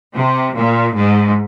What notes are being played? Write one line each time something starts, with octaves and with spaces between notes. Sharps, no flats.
C3
A#2
G#2